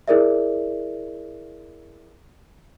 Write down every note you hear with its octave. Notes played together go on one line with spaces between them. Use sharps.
E4 G#4 A#4 D5 E5